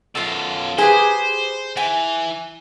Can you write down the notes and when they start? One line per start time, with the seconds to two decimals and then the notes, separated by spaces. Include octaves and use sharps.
0.15 F#2 B2 F4 A4
0.78 G4 G#4 B4 C5 D#6
1.77 E3 G#5